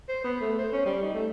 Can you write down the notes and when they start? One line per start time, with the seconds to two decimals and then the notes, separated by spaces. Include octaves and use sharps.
0.08 C5
0.24 B3
0.41 A3
0.58 C5
0.72 C#4
0.86 G3
1.02 D#4
1.14 A3